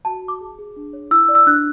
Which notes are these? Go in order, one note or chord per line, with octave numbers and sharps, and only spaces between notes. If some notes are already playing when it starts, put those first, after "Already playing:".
F#4 A5
F#4
D6
G#4
G#4
D4
C#5
E4 E6
D5
E6
D4 F#6